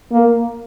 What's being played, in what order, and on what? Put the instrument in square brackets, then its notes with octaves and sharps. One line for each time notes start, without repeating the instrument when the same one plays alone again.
[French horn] A#3